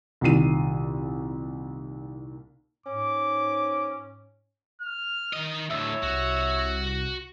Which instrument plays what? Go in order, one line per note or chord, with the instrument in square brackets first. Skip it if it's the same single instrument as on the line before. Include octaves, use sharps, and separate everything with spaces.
[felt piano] C2 A#2 D#3 C7 D#7
[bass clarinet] G#2 [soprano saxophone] C#4 [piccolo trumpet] D6
[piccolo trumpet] F6
[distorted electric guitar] D#3 D#5
[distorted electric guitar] D2 A2 [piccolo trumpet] C#5 [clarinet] E5
[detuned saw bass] C2 [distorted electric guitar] F#4